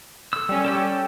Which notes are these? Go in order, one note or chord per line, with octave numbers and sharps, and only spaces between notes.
A4 E6
G3 C#4
A4 G5 E6